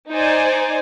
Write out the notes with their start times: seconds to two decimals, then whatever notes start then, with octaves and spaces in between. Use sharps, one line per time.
0.11 D#4 C5 D5 G#5